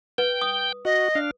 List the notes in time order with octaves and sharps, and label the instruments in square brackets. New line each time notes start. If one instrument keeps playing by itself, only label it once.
[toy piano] B4 [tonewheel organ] G5 G6
[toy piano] D#6
[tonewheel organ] F#4 [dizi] D#5
[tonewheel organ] D4 F5